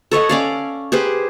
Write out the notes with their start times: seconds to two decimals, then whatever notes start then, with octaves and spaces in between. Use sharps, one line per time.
0.11 A4 C#5 D#5 F#5
0.29 C#4 D5 F5
0.92 G4 G#4 B4 C5